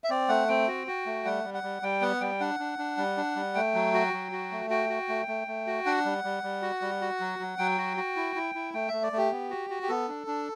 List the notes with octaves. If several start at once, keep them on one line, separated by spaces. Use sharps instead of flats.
E5
C4 D5
A3 F#5
C4 G5
F#4
F#4
A3
G3 F#5
G3
F#5
G3
G3 G5
B3 F#5
G3 G5
D4 F#5
D4
D4
G3
D4
G3
A3 G5
F#3
F#4
F#3
F#4
A3
F#4 G5
F#4
A3
A3
A3
F#4
D4 F#5
G3
G3
G3
F#4
G3
F#4
F#3
F#3
F#3 G5
F#4
F#4
E4
E4
E4
A3 G5
A3 E5
D5
A3 G4
B3
F#4
F#4
G4
B3 A4
D4
D4